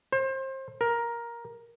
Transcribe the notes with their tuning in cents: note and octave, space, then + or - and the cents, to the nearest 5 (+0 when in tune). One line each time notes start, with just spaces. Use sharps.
C5 +30
A#4 +10